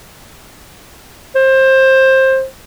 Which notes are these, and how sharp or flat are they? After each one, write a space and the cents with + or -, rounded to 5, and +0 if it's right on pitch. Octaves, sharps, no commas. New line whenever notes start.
C5 +20